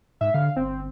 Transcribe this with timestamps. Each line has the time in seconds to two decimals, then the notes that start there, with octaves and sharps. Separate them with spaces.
0.21 G#2 E5
0.34 D3 F5
0.56 G1 C4